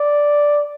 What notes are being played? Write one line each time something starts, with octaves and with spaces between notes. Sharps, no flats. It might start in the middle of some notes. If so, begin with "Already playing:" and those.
Already playing: D5